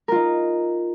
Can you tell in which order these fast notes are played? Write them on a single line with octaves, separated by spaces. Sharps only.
A#4 F4 D#4